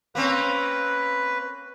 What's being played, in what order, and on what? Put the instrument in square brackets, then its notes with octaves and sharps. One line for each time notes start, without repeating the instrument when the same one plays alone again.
[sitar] A#3 C4 C#4 [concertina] B4